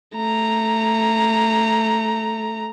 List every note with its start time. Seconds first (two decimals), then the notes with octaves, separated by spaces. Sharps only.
0.16 A3 A#5